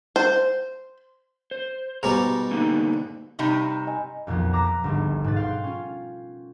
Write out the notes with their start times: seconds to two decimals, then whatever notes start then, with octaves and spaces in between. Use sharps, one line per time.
0.16 C5
1.51 C5
2.03 G#2 B2 G3 A#5
2.51 D3 A#3 D#4
3.39 G2 C3 D#4
3.87 D#5 G#5
4.27 B1 F2 A#2 F3 B3
4.53 A#5 D6 E6 F#6 A#6 B6
4.84 G1 C#2 G#2
5.24 G#2 B2 B4 A6
5.36 F5 G5 C6
5.64 C#4 F4